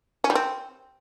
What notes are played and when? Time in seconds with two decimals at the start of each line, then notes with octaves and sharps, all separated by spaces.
0.24 C#4
0.30 G3
0.35 C4